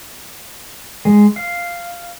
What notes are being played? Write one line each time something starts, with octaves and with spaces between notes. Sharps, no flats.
G#3
F5